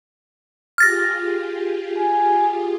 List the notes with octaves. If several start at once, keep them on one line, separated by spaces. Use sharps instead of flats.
F4 G4 G#4 F6 A6 A#6
G#5